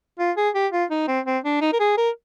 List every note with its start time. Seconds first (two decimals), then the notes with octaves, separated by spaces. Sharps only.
0.19 F4
0.37 G#4
0.54 G4
0.72 F4
0.90 D#4
1.08 C4
1.26 C4
1.44 D4
1.61 D#4
1.73 A#4
1.80 G#4
1.97 A#4